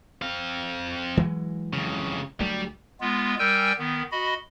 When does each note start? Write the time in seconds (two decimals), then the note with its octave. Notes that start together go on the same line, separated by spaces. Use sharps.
0.22 C4 F5
1.17 E3 F#3 G#3
1.73 F2 C#3
2.40 D2 F#3 G3 A3
3.01 G#3 B3 F4
3.39 G3 A#4 G5 G#5 E6 G6
3.79 D#3 B3
4.12 F#4 D#5 B5